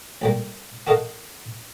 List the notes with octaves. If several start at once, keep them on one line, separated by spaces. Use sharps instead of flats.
D2 G3 A#3
F#4 A4 A#4 D#5 F5 F#5